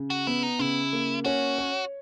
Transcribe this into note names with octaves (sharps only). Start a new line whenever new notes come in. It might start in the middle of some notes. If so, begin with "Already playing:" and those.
Already playing: C#3
F#4
B3 E4
D#4
C#3 E4
A#3
C#4 F#4
C#5